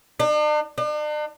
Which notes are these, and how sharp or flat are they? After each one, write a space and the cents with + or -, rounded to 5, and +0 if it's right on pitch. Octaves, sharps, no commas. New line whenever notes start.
D4 +45
D4 +45